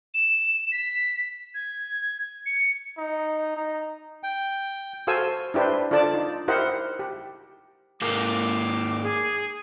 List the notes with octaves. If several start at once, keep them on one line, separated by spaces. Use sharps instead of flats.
E7
B6
G#6
C#7
D#4
D#4
G5
F#4 A4 C5 F5 G#5 E6
D4 E4 G4 B4 C5
D4 F4 A4 D5 A5
D#4
E4 G4 A#4 C5 D#5 F#5
G4
G#2 A#3 D6
G#4